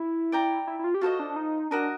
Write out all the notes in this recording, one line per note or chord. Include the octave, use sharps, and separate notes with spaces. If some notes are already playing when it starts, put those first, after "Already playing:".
Already playing: E4
D5 G5 A#5
E4
E4
F4
G4
F4 F#4 A4 C5 D#5
D4
D4
D#4
D4 F#4 A#4 D#5